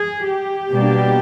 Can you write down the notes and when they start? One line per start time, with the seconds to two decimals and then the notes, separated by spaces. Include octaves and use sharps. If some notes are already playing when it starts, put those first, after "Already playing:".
Already playing: G#4
0.30 G4
0.71 B2 G3 A#3 D4